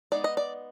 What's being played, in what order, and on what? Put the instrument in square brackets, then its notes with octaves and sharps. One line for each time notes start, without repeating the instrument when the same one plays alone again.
[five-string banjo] G#3 B3 D#4 D5
D#5
D5